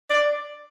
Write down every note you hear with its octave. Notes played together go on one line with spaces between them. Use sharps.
D5